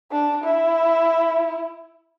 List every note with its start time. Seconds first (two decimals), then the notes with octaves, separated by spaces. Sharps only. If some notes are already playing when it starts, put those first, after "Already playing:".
0.12 D4
0.44 E4